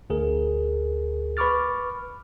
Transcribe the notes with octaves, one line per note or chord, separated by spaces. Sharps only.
D2 G#4 A#4
B4 B5 C#6 D6 F6 A6